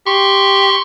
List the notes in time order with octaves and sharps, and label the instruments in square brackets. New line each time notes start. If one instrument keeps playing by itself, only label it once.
[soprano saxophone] G4 [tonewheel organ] C6 C#6